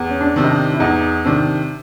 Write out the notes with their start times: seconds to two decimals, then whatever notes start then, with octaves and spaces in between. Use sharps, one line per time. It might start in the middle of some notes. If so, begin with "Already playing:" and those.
Already playing: E2
0.10 C#4
0.21 D4
0.36 C3 D#3
0.44 D#4
0.50 D4
0.74 E4
0.80 E2 D#4
1.25 C3 D#3 D4